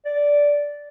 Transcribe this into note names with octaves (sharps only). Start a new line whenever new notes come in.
D5